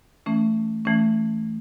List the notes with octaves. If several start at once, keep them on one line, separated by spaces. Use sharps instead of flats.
E3 A3 C#4
E3 A3 C#4